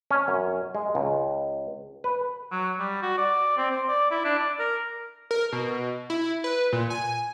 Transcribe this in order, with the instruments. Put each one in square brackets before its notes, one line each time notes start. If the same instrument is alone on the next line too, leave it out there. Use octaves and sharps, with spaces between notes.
[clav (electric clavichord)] C#4
F#2
G#3
C#2
B4
[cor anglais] F#3
G3
F#4
D5
C4
C5
D5
E4
D4
D5
A#4
[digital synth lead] A#4
B2
E4
B4
A#2
G#5